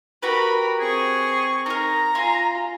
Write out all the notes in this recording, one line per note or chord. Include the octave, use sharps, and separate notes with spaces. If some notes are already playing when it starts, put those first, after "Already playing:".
F#4 G4 A#4 B4 B5
C4 G#4 C#6
D#4 A#4 A#5
F4 G#5 C6